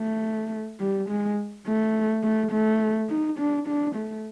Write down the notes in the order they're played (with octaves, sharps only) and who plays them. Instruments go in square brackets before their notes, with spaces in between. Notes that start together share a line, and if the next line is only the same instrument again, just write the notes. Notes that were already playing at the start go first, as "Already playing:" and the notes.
Already playing: [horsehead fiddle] A3
G3
G#3
A3
A3
A3
D#4
D4
D4
A3